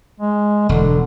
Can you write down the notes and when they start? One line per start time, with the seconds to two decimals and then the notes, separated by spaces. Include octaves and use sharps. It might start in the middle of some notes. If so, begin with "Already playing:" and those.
0.20 G#3
0.69 E1 D3